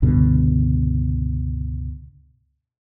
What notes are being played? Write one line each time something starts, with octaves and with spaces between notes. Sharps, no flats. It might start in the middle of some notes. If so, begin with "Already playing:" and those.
C#2 G2 B2 D3